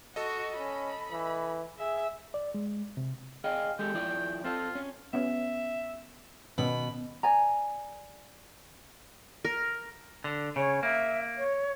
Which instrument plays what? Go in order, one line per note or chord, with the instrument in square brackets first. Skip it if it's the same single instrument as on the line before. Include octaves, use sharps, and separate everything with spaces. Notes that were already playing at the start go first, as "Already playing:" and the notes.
[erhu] F#4 [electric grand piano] A4 D#5
[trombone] C#4 [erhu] B5
[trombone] E3
[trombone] G#4 [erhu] E5
[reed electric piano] D5
G#3
C3
[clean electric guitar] G#4 D#5 G5 [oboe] F5
[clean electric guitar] G#3 G4 A4 [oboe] G5
[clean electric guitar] F3 E4 D5
[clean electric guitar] C4 A4 [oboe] F4
[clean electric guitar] C#4
[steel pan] B3 C#4 [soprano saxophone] E5
[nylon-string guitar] B2 [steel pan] D#3 C#4 B4 [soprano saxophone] B5
[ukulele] D5 G#5 A#5
[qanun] A#4
[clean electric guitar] D3
[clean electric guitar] C#3 [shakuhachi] C#5
[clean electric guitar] A#3 [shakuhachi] E5
[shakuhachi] C#5